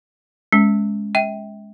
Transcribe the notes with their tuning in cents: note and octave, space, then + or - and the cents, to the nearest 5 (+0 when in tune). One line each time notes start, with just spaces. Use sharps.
G#3 +0 C#4 +0
E5 -30 G5 +0